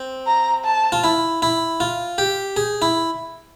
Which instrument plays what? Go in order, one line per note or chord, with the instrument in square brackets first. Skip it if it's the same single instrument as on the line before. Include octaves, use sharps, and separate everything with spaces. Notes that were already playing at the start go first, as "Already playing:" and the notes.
Already playing: [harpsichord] C4
[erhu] A#5
A5
[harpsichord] F4
E4
E4
F4
G4
G#4
E4